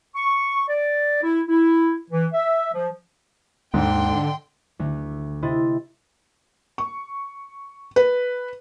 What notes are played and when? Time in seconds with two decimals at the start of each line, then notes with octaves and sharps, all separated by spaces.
0.15 C#6
0.69 D5
1.22 E4
1.48 E4
2.10 E3
2.33 E5
2.73 F3
3.74 D#2 G#2 D3 G5 C6
4.79 D2 D3
5.42 C3 E4 D#5 C6 A6
6.78 C#6
7.96 B4